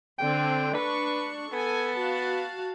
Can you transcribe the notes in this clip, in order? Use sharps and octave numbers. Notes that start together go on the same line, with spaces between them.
D3 C4 G5
D4 B4 C#6
B3 A4 G#5
F#4 F5 A5